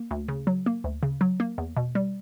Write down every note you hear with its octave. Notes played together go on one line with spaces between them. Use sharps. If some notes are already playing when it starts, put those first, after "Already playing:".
Already playing: A#3
D2
C#3
F#3
A#3
D2
C#3
F#3
A#3
E2
B2
G3